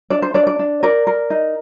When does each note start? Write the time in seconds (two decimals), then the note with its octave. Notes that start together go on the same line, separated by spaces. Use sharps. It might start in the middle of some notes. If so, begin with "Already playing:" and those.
0.10 D4 D5
0.22 C5
0.34 D4 D5
0.47 D5
0.59 D4
0.83 A#4 D5
1.07 A#4
1.30 D#4